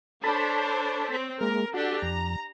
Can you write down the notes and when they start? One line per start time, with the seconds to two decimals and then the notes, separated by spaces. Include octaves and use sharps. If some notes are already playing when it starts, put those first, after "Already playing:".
0.24 D4 A4 C5 C#5 A5 B5
1.11 C4
1.41 G#3 A#3 A#4
1.74 D4 F#4 G4 A4
2.02 F2 A#5